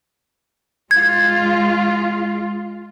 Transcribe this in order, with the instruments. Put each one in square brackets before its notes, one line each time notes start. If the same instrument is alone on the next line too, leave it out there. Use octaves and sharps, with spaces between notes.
[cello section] G#3 F4 [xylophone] G#6